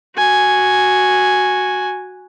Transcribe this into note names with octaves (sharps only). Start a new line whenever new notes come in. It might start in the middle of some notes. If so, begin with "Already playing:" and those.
F#4 G#5